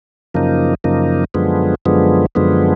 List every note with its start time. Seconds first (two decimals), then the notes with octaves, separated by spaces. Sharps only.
0.34 F#2 C#3 F3 A#3 D#4
0.84 F#2 C#3 F3 A#3 D#4
1.34 F#2 D3 F3 G#3 B3
1.86 F#2 D3 F3 G#3 B3
2.35 F#2 D3 F3 G#3 B3